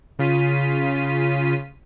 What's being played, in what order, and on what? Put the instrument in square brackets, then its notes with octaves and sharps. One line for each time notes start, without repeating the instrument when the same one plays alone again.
[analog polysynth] C#3 F4 B6 D#7